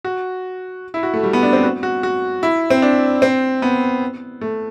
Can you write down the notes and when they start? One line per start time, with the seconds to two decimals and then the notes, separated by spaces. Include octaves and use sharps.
0.05 F#4
0.94 E4
1.03 F#4
1.14 A3
1.23 G3
1.33 B3
1.43 D4
1.53 C4
1.63 F#4
1.83 F#4
2.03 F#4
2.43 E4
2.70 C4
2.82 D4
3.22 C4
3.62 B3
4.41 A3